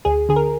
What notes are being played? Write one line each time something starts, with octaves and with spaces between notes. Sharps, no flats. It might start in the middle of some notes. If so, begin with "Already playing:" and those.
D2 G#4
D3 G#4
A#4